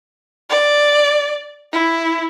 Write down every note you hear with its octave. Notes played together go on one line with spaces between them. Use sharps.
D5
E4